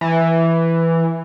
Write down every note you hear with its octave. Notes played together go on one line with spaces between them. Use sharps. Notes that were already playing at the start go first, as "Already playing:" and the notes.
E3